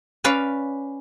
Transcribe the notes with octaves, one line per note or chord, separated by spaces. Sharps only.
C#4 B4 D5 F5